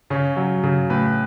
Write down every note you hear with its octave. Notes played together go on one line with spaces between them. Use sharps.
C#3 C#4
F#3
C#3
A2 B4